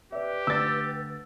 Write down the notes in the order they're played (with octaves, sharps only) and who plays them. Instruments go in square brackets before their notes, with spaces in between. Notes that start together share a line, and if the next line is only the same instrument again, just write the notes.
[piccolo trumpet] G4 [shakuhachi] B4 [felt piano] D5 E5
[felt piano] D2 [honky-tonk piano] E6 A6